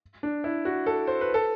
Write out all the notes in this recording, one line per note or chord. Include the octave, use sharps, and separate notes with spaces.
D4
E4
F#4
A4
C5
B4
A4